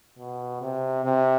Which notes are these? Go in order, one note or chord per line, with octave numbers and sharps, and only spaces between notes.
B2
C3
C3